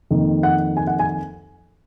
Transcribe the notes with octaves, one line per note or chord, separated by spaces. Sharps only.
F2 D#3 A#3
F#5
G#5
F#5
G#5